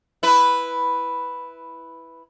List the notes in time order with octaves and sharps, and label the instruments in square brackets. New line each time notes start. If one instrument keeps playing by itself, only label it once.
[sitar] E4 B4